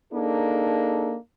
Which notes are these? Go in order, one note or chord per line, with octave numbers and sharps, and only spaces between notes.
A#3 D4 D#4 G#4 A4